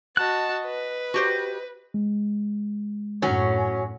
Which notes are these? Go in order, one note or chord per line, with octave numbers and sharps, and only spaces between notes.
F#4 D#5 A5 F#6
B4
F#4 G4 C5
G#3
F#2 A2 F#3 C#4